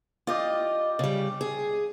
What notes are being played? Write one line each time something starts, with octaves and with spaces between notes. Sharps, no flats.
F4 G4 D5 D#5
C#3 G3
G#4